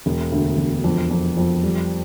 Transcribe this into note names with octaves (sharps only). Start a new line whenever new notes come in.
E1
D2
E1
F2
F2
F2
G3